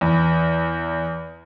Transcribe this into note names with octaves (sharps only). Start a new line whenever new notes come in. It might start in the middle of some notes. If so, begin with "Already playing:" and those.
E2